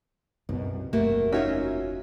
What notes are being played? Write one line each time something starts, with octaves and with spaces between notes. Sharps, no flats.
C2 F#2 B2
F#1 E2 A3 A#3 F#4
C#4 D#4 F4 F#4 C#5 E5